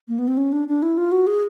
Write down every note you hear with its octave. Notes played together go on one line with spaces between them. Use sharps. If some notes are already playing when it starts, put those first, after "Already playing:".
A#3
B3
C4
C#4
D4
D4
E4
F4
F#4
G#4